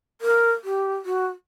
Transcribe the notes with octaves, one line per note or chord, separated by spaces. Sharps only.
A#4
G4
F#4